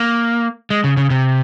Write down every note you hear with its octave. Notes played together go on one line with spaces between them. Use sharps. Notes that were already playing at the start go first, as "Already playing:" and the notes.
Already playing: A#3
G#3
C#3
C#3
C3